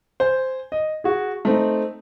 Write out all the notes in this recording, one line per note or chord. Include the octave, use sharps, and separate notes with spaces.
C5 G#5
D#5
F#4 G#4
A3 C4 D#4